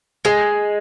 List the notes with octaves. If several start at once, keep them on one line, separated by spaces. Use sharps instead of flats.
G#3 G#4